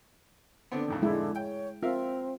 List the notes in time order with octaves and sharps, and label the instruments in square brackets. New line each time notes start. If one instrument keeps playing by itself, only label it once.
[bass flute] D3 [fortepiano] B3 C4 D4
[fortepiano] F2 A2 D#3
[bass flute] D3 [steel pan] G#3 E4
[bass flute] C#5 [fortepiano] G5
[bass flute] C4 [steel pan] F4 [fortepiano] A#4 E5 F5